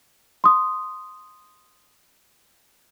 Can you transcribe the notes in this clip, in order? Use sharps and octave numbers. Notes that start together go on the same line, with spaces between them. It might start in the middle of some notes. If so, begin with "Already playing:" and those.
C6 D#6